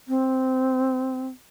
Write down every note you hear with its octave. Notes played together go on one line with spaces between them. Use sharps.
C4